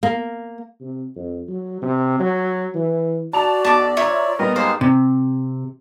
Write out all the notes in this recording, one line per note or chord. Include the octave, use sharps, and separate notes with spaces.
A#3
C3
F2
F#3
C3
F#3
E3
F#4 D5 A5 F7
B1 A5 D6
F4 C#5 E5 A#5
A#2 G3 B3 A#4 D#5
G#3 A#3 D#4 G4 C5
C3